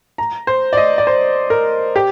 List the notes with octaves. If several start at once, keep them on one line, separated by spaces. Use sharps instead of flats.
A#5
C5
D5
D#5
D5
C5
A#4
G4